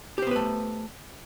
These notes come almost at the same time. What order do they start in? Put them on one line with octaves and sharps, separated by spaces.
G4 C5 B3 B4 A3